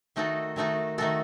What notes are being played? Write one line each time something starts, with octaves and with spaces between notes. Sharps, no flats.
D#3 A3 D#4 F#4 A4
D#3 A3 D#4 F#4 A4
D#3 A3 D#4 F#4 A4